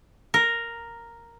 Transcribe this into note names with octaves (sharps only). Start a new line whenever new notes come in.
A#4